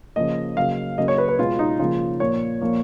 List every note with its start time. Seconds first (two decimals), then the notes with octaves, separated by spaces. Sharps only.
0.16 C#3 F3 A#3 D#5
0.57 C#3 F#3 A#3 F5
0.98 C#3 F#3 A#3 D#5
1.08 C#5
1.18 B4
1.28 B4
1.39 B2 G#3 F4
1.59 D#4
1.79 C#3 F3 A#3 F4
2.20 A#2 F3 A#3 C#5
2.62 A#2 F3 A#3